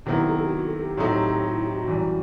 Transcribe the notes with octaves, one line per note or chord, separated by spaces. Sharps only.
C3 D#3 F#3 B3 E4
G4
A4
G4
F#4
A4
G4
A2 F#3 C4 D#4 F#4 A4
G4
G4
F#4
E4
G4
F#4
F#2 E3 G3